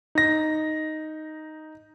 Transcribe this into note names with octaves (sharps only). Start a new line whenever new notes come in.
D#4 A#6